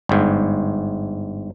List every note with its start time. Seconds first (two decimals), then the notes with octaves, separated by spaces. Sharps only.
0.09 G1 G#2